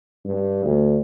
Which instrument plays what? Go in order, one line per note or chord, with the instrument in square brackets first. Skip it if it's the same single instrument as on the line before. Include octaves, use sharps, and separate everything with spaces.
[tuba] G2
D2